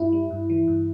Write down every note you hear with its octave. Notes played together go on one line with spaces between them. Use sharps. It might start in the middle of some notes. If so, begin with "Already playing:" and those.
Already playing: G2 E4
G3
G2
E3
G2